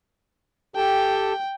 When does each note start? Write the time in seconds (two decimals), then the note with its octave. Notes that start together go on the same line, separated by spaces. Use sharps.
0.76 G4 A4 G5 A5